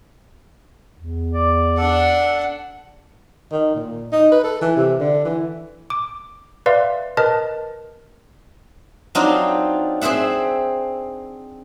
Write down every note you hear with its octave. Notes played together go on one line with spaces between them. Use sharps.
E2
D5
D4 A4 F#5
D#3
A#2
D#4
B4
A4
E3
C3
D3
E3
D6
B4 D5 E5 F5 C6
A#4 B4 D#5 A5 F6
F#3 C4 D4 D#4 F4
C4 G#4 C5 E5 F#5